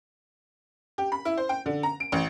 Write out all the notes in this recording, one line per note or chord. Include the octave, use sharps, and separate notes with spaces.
G4
B5
E4
C5
G5
D3
A#5
D7
A1